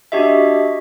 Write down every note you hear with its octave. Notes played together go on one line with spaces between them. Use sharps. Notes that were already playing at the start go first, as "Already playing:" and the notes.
D4 F#4 G4 D#5 E5